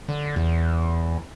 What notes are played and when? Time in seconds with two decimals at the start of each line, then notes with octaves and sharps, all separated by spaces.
0.08 D3
0.36 E2